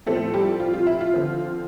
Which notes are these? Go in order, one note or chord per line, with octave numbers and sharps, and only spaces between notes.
A2 F3 A3 C4 A4
G3 G4
F4
F4
E4
F4
D3 F3 C4